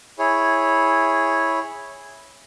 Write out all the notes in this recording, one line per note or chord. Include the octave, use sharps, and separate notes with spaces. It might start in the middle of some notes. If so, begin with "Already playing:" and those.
E4 G#4 C#5